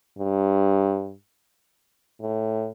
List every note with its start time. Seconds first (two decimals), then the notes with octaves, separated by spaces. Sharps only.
0.19 G2
2.21 A2